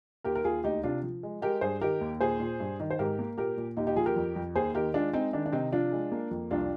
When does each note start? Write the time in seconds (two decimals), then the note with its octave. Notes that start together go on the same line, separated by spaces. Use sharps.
0.24 D#2 G4 A#4
0.35 A#4
0.44 D#2 F4 G#4
0.64 D2 D#4 G4
0.84 C3 D4 F4
1.03 F3
1.23 G#3
1.42 G#3 G4 A#4
1.61 G2 G#4 C5
1.81 D#3 G4 A#4
2.01 D#2
2.20 A#2 G#4 C5
2.40 A#2
2.60 G2
2.80 D#3
2.90 C5
2.99 G#2 G4 A#4
3.19 A#3
3.38 A#2 G4 A#4
3.57 A#2
3.77 D#2 D#4 G4
3.87 D#4 G4
3.96 F3 F4 G#4
4.06 G4 A#4
4.16 F2
4.36 F2
4.55 D#2 G#4 C5
4.75 D#3 G4 A#4
4.94 G#3 D4 F4
5.13 G#3 C4 D#4
5.33 D#3 D4
5.46 D4
5.52 C3 C4 D#4
5.72 F3 D4 F4
5.92 G#3
6.12 A#3
6.31 F2
6.51 C2 D4 F4